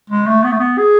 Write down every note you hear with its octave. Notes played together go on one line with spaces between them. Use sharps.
G#3
A3
B3
A3
B3
G#4